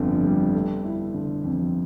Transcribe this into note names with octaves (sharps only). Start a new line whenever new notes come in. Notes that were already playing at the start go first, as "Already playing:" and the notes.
Already playing: G1 F2 D3
G3
A3
E4
D3
F2